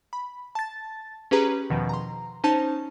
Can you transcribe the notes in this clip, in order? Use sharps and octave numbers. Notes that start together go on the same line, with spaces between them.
B5
A5 A6
C#4 G4 G#4 B4 A#5
E2 B2 D#3 F3
A#5 C6
C#4 D#4 C5 A5